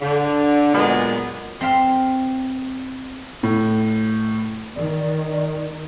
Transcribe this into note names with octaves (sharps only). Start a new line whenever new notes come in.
D3
A#2 F#3 G#3 B3
C4 E5 F5 C6
A2
D#3 D5